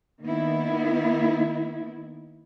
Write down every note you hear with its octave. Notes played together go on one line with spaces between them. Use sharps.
D#3 A#3 B3 E4